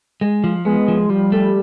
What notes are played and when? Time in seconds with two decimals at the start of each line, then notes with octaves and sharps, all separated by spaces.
0.21 G#3
0.44 F3
0.65 G#3 B3
0.88 F3
1.10 F3 G3
1.32 A3